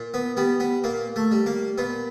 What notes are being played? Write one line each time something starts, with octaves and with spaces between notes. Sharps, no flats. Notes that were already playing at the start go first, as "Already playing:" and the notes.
Already playing: A#2
B3
G3 B3
B3
A#2 A#3
A3
G3
A#3
A#2 B3